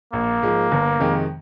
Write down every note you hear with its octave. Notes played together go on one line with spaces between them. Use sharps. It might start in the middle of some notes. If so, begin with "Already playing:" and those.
A#1 A#3
G#2 F3 G#3
G1
F2 C3 D#3 G#3